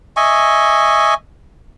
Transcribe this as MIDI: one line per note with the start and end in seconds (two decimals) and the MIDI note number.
0.17 1.14 75
0.17 1.14 76
0.17 1.14 80
0.17 1.14 85